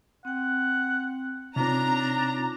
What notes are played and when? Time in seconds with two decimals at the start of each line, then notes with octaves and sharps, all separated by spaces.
0.25 C4 F#5 G5
1.56 C3 C4 D4 D#4 F4 C#5 A#5